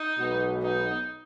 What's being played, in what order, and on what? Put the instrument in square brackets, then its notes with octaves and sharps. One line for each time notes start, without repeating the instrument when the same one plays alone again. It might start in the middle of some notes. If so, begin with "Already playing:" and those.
Already playing: [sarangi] D#4
[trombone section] B1 B2 G#3 B3 F#4
[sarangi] D#4